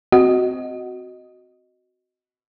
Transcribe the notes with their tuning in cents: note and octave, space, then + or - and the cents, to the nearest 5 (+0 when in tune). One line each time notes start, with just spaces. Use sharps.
C4 -15 F#4 +0 D#5 +0